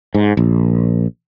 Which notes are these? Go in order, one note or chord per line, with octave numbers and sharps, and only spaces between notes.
G#2
A#1